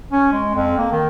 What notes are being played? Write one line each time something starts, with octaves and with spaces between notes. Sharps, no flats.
C#4
G#3
F2
A#3
D#3